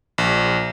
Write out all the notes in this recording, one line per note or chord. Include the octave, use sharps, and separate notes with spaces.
A#1